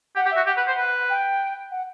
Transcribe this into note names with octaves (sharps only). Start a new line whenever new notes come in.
G4 F#5
G4
E5
F#4
G4 F#5
B4
C5
B4
G5
F#5